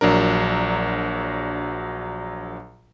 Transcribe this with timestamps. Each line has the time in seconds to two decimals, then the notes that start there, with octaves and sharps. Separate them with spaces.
0.01 A#1 F#3 D4 A#4